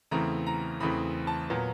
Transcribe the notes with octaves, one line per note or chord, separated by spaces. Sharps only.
E2 C#3 E3 A3 C4 A#5
A#5
E2 C#3 E3 A3 C4 B5
A5
A#2 F#3 B3